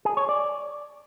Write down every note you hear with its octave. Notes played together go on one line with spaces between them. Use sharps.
G#4
C#5
D5